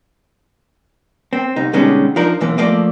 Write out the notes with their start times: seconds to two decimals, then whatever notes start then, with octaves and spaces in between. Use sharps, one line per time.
1.33 C4
1.56 C2 D#4
1.73 B2 D3 G3 G#3 C#4 D#4
2.16 F3 D4 D#4 A#4
2.41 B1 F#2 E3 A#3
2.58 F3 A3 A#3 D5 D#5